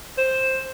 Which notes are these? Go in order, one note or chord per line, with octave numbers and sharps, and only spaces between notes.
C5